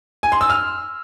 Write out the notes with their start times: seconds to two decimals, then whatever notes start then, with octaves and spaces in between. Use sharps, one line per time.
0.23 G#5
0.32 C6
0.41 E6
0.50 F6